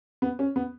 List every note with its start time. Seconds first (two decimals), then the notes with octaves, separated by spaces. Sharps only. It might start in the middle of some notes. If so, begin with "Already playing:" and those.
0.22 B3
0.39 C#4
0.56 B3